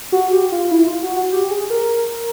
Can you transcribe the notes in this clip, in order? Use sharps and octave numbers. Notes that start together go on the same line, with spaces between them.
F#4
G4
F4
E4
F4
F#4
F#4
G4
G#4
A#4